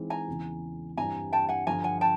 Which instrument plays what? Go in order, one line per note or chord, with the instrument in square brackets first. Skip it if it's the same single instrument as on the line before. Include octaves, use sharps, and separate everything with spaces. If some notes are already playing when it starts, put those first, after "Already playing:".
Already playing: [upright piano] E3 G#3 C4 D#4
[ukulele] G#5 A#5
[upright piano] E2 C#3 E3
[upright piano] G2 E3 G3 C4 E4 [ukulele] G#5 A#5
[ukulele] G5 A5
F#5 G#5
[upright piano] G2 D3 F3 [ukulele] G#5 A#5
[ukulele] F#5 G#5
G5 A5